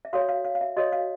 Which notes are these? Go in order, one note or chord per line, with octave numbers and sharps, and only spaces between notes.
E5
F#4 A4 C#5 F5
F5
F5
F5
E5
F#4 A4 C#5 D#5
F5